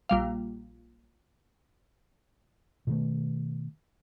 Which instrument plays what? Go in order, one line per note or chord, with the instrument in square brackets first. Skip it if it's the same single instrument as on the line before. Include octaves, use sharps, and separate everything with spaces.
[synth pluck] A#1 G3 F5
[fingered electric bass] B2 D#3 A3